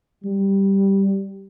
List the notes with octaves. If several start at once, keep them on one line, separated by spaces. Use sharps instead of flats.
G3